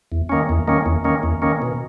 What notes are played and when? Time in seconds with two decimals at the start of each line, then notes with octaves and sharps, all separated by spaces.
0.12 E2
0.29 D#3 A#3 C#4
0.49 E2
0.68 D#3 A#3 C#4
0.86 E2
1.04 D#3 A#3 C#4
1.23 E2
1.42 D#3 A#3 C#4
1.62 B2